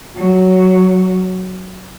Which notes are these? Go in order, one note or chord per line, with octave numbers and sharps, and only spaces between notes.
F#3